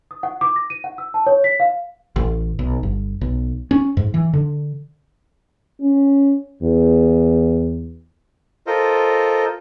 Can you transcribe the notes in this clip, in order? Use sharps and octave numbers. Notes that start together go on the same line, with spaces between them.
D#6
F#5
D6
A#6
D#7
F#5
E6
A5
C#5
B6
F5
A1
B1
G1
B1
C#4
G#2
E3
D3
C#4
E2
F4 A4 A#4 C5 D#5